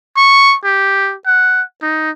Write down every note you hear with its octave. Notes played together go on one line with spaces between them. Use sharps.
C#6
G4
F#5
D#4